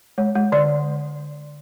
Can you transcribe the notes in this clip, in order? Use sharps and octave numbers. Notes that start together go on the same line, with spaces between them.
G#3 C#5
G#3
D3 D5